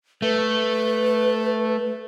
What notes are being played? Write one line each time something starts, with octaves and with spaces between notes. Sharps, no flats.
A3 B4